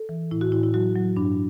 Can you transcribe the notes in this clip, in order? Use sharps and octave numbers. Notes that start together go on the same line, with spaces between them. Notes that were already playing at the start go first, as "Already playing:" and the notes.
Already playing: A4
E3
A2 E4
F#4
A2 E4
E4
F#3 F#4
F#3
G2 D4